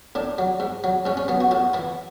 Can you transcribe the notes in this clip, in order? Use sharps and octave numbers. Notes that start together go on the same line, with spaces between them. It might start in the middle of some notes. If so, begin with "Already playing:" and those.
A2 D4
F#3
G#2
F#3
G#2 C#4
C#4
F#3 B3
F#4
A2 F#4
E3 E4